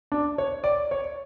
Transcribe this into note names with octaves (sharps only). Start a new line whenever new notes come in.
D4
C#5
D5
C#5